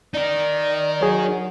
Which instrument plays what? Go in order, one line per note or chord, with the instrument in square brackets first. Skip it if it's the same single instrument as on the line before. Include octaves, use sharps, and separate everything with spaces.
[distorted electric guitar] D#4 A#4 [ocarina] D5
[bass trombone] F#3 [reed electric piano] G#4 C#5